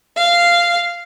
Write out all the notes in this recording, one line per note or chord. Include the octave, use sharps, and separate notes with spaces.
F5